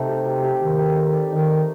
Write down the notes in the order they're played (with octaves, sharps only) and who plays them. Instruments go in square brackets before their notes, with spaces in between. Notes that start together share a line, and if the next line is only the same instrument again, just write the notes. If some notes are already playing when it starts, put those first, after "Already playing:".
Already playing: [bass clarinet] C3 [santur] A3 C4 D#4
[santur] G4
G4
G4
[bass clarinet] D#3 [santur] G4
[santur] G4
D#4
D5
[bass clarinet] D#3 [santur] D#4
[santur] D#4